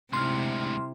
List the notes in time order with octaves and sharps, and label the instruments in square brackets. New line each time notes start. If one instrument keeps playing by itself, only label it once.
[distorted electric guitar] D2 G#2 [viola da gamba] C3 E4 [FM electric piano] C6 F6